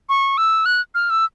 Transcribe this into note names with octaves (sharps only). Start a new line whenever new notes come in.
C#6
E6
F#6
F6
E6